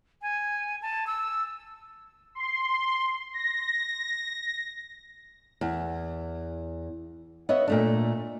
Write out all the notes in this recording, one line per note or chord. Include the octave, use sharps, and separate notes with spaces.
G#5
A5
E6
C6
A#6
E2
B3 C#5 D#5 E5
A#2 A3 D4